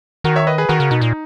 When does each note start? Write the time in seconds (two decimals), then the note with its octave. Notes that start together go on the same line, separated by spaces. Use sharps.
0.24 D#3 F#4 A#4
0.36 C#5 E5
0.47 B4 D#5
0.58 G#4 B4
0.69 D#3 F#4 A#4
0.80 C#3
0.91 B2 D#4
1.02 A#2